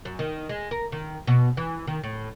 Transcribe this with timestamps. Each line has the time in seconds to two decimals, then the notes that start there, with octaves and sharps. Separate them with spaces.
0.05 F#2
0.19 D#3
0.49 G#3
0.71 A#4
0.92 D#3
1.27 B2
1.57 E3
1.87 D#3
2.04 A2